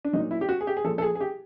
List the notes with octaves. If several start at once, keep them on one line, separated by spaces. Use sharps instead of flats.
D4
A#2 F#3 D#4
E4
G4
F#4
G#4
G4
G#4
A#2 F3 A4
A4
G#4
G#4
G4